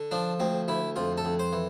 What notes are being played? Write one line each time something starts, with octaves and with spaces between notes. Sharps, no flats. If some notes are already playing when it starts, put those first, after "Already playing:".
Already playing: D3
F3 D4
D2 C4
D2 E4
F2 F4
A4
F2
C5
E3